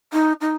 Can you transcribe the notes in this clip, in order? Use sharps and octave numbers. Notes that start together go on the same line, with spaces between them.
D#4
D#4